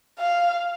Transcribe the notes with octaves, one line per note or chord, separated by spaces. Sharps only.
F5